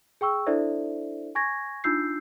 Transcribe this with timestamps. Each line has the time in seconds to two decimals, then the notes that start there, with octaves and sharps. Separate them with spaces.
0.21 G#4 G5 C#6 E6
0.47 D4 E4 A4 C5 D5 E5
1.35 G#5 C#6 G#6 A#6
1.84 D4 D#4 F4 E6 G6 C7